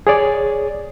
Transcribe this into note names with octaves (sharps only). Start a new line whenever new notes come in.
G#4 C#5 D5